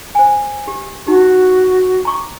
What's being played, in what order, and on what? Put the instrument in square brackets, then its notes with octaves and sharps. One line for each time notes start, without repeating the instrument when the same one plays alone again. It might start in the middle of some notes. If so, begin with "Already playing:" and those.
[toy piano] C5 G#5
G4
[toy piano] D#4 G4 [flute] F#4
[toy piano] A#5 C#6 D6